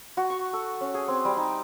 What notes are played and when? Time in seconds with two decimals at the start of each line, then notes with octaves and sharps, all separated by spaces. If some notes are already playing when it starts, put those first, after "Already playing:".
0.17 F#4
0.30 C#6
0.53 A4
0.81 C#4
0.94 G#4
1.08 C4
1.25 G3
1.37 D#4